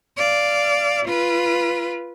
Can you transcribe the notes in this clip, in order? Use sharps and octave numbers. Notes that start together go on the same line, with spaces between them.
D5 F5
F4 B4